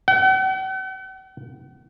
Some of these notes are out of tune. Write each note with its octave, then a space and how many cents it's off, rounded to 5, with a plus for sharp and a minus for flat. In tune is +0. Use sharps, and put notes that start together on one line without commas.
F#5 +45